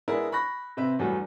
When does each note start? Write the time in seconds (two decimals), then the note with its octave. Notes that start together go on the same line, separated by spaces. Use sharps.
0.08 G#3 B3 D4 E4 G#4 A#4
0.32 B5 C#6 F#6 A#6
0.77 C3 C4 B4 E5
0.99 E2 G2 F#3 G3 A3